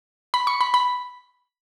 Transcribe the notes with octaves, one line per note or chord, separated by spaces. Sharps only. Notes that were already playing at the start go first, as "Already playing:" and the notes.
B5
C#6
B5
B5